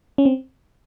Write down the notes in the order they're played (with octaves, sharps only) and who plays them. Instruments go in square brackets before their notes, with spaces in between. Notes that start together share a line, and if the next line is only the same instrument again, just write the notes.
[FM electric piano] C#4
C4